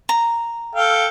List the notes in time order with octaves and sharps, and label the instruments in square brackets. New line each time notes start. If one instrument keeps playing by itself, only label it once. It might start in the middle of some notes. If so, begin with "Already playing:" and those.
[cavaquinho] A#5
[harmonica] A4 F5 G5